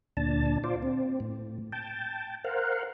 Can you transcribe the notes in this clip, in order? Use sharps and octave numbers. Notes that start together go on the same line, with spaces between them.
D2 A#2 D4 A5
F4 C5 D5
C4
A2
G5 A5
A#4 C5 F5 F#5